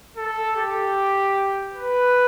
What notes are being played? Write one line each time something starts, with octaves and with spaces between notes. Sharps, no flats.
A4
G4
B4